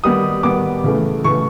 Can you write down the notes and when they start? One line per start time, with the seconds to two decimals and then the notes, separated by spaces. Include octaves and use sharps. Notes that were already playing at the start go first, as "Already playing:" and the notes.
0.04 D#3 G3 B3 D#6
0.43 D#3 G3 B3 D6
0.84 C#3 E3 A3
1.24 C#3 E3 A3 C#6